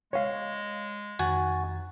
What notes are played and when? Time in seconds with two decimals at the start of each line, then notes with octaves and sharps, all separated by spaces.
0.13 G#3 C#5 F5
1.19 F2 D#3 F#4 G#5 A6